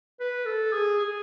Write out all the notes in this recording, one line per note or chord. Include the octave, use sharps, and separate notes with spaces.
B4
A4
G#4
G#4